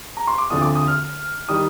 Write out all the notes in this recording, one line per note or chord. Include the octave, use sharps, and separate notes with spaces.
A#5
C6
D6
D2 D3 F3 C4 D#6
D6
D#6
F6
D#3 G3 D#6